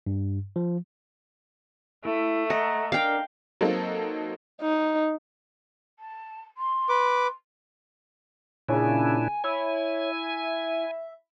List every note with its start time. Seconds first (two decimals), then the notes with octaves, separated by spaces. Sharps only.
0.06 G2
0.56 F3
2.05 A3 E4
2.50 D#5 F#5 A5 A#5
2.92 D4 A#4 F5 G5
3.61 F#3 A#3 C4 D#4 A4
4.62 D#4
5.99 A5
6.57 C6
6.89 B4 D6
8.69 A#2 C#3 D4 E4 G#5
9.44 E4 C#5 G#5
10.12 E5